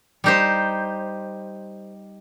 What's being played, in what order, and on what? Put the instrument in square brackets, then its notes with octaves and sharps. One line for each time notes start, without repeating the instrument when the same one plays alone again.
[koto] G3 D#4 G4 C5